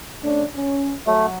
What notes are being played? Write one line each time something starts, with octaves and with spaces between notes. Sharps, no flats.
A3 C#4 D4
C#4
F#3 A3